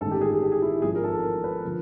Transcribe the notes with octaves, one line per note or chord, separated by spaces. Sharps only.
A1 G#2 D#3 A4
G4
G#4
G4
G#4
E4
G#1 G#2 F3 G#4
A#4
A4
A#4
B4
D3 F3